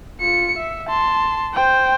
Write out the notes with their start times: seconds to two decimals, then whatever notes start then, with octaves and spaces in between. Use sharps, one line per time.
0.20 F4 C#7
0.57 E5
0.89 A5 C6
1.54 C5 G5